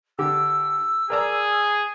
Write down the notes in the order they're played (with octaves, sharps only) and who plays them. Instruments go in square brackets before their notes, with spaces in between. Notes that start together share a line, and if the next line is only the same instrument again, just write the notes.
[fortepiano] D3 G4 [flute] E6
[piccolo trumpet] G#4 [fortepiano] A#4 D5 A#5